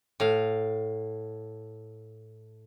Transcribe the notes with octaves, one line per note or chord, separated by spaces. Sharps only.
A2 F5